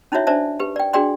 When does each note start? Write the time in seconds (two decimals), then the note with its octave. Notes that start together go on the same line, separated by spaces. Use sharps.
0.12 C#4 D#4 E4 F#4 C#5 E5
0.27 D4 C5 D5 E5 A5
0.60 G4 B4
0.76 D5 G5
0.93 D4 F#4 G#4 D5 G5 C6